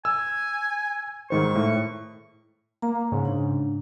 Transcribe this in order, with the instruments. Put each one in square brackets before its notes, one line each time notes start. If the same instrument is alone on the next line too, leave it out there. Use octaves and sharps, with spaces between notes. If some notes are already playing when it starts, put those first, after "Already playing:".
[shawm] G#5 [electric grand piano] E6
[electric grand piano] G#2 D#3 C5 [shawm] C#6
[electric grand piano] A2
[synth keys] A#3 [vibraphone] A#5
[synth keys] G#2 C#3
[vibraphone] D4